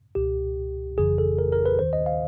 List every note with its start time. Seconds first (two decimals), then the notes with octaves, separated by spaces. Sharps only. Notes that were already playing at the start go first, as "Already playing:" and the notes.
0.15 C#2 B2 G4
0.97 G1 F2 C#3 E3 G#4
1.18 A4
1.39 A#4
1.52 A#4
1.66 B4
1.79 D#2 D#3 C5
1.93 D#5
2.06 F5